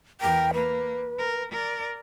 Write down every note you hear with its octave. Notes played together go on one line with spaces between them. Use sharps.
E2 A#4 G5
A#3 B4
A#4
A#4 D5